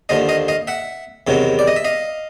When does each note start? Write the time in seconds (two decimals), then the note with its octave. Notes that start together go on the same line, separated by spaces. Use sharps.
0.09 D#2 D3 F3 D#5 F5
0.29 D#5 F5
0.48 D#5 F5
0.67 E5 F#5
1.27 E2 C3 D#3 F#3
1.59 D5
1.67 D#5
1.76 E5
1.84 D#5 F5